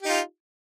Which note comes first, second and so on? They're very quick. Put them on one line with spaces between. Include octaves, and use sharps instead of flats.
G4 D#4 F4